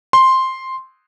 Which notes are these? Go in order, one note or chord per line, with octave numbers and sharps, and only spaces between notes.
C6